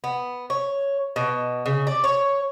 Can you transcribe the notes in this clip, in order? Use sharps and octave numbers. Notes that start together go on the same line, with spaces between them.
B3
C#5
B2
C#3
D5
C#5